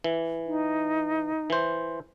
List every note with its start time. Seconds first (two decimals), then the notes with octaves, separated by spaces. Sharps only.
0.04 E3
0.46 D#4
1.50 E3 C5